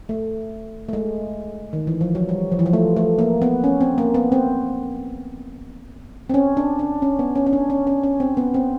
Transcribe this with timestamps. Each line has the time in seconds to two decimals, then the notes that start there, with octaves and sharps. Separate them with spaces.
0.09 A3
0.89 A3
0.93 G#3
1.73 D#3
1.87 E3
2.01 F3
2.15 F#3
2.29 G3
2.52 F3
2.59 E3
2.66 F3
2.73 A3
2.96 A3
3.19 A#3
3.42 B3
3.64 C#4
3.81 C4
3.98 A#3
4.14 B3
4.32 C4
6.30 C4
6.34 C#4
6.57 D4
6.79 D4
7.02 C#4
7.19 B3
7.36 C#4
7.46 C#4
7.53 D4
7.70 C#4
7.87 C#4
8.03 C#4
8.20 C4
8.37 B3
8.54 C4